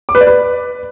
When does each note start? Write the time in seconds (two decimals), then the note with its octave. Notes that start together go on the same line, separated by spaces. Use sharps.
0.09 D6
0.15 B4
0.21 D5
0.27 B4